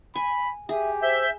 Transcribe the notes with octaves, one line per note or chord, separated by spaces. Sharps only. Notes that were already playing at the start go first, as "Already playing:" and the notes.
G#5 B5
G4 G#4 E5
C5 E5 G6